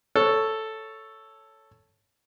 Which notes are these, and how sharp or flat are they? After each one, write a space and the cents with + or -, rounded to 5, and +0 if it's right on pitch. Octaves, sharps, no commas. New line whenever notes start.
A4 +0 C#5 +0